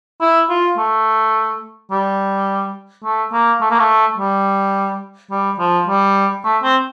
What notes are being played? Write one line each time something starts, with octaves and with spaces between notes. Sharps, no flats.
E4
F4
A3
G3
A3
A#3
A3
A#3
A3
G3
G3
F3
G3
A3
C4